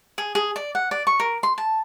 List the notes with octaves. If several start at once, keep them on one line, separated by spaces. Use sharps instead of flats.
G#4
G#4
D5
F#5
D5
C#6
A#4
C6
A5